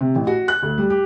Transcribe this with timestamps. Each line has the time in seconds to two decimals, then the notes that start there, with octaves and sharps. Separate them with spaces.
0.01 C3
0.15 A1
0.27 F#4
0.48 F#6
0.62 D2
0.78 G3
0.90 G4